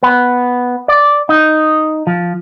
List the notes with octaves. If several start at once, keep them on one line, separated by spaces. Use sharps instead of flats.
B3
D5
D#4
F3